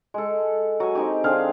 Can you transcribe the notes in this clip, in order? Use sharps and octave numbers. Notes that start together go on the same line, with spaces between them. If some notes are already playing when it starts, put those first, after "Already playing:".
G#3 A4
F#3 G#5
C4 D#4 G4
D3 C4 G#4 F5